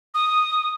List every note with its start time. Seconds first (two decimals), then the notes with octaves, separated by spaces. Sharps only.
0.14 D#6